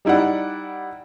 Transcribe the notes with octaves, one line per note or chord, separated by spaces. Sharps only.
G3 D#4 E4 D5 F#5